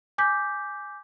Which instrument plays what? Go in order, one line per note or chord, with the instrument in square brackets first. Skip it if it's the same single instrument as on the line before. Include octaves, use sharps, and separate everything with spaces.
[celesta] G#5 D6 G6 B6